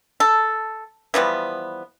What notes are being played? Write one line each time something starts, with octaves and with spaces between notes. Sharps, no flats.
A4
E3 F3 G3 B3